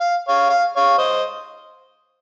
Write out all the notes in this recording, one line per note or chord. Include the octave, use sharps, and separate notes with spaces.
F5
C#5 F5
F5
C#5 F5
C5 D#5